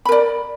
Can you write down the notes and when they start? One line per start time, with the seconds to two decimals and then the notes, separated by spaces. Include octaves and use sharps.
0.05 B5
0.09 A#4
0.12 D5